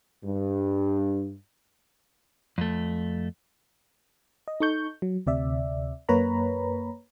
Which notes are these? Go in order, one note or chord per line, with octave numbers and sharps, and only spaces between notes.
G2
F2 A3
D#5
D#4 A4 C#6 G6
F#3
D2 C3 D5 E5
F#2 A#3 B4 C#5 A#5 B5